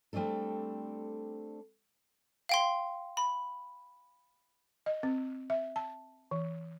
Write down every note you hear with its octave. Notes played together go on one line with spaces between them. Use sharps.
G3 A3 C4 D4 A4
F5 G5 C6
B5
D#5
C4
E5
A5
E3